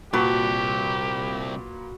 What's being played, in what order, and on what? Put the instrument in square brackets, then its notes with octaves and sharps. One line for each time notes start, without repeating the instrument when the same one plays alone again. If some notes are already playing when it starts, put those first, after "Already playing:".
[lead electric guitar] C2 A5 [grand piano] A#2 [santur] F#4 B4 [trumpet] G4